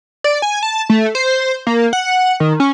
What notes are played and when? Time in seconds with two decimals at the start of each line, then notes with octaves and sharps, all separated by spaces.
0.24 D5
0.42 G#5
0.63 A5
0.90 A3
1.15 C5
1.67 A#3
1.93 F#5
2.40 D#3
2.60 C#4